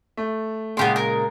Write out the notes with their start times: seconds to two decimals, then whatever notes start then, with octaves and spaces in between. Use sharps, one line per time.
0.17 A3
0.77 A#2 C#3 G#3 B3 G4 C6
0.96 A#4